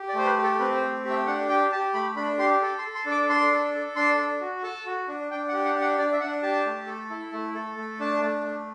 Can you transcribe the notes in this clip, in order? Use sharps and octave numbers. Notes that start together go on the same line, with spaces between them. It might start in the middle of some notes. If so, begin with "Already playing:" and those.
Already playing: G4
D5
A3 C5
B4
G4
A4
C4 B4
C5
A3
G4
E5
D4 F#5
G4 G5
G4 A5
A3 B5
D4 B5
G4 C6
A4
C6
A4
C6
D4
D6
D4 C6
A4
A4
D4 C6
D4
F#4
A4 A5
F#4
D4
D4 G5
F#5
G4
F#5
D4
F#5
D4 D5
E5
D4 F#5
G4 A5
A3
A4
E4
A3
A4
A3
D4 A5
A3
A3